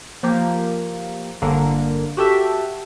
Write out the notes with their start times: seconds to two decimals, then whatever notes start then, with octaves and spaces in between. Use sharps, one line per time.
0.23 F3 A#3 G4
1.42 G1 D3 A#3
2.17 F#4 G4 A4 E5